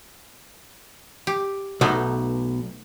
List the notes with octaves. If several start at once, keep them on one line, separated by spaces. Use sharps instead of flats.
G4
B1 A3 B3 D#4